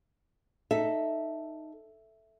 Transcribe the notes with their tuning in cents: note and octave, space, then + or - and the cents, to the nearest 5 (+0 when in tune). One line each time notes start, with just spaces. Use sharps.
D#4 -10 A4 +0 E5 +0